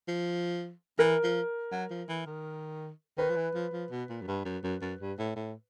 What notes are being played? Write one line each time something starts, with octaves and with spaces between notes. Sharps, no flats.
F3
E3 A#4
F3
F#3
F3
E3
D#3
D#3 B4
F3
E3
F3
F3
B2
A#2
F#2
G2
F#2
F#2
F#2
G2
A2
A2